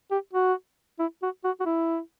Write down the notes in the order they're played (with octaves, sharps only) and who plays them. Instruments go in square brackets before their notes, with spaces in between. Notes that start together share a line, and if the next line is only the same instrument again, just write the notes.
[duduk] G4
F#4
E4
F#4
F#4
F#4
E4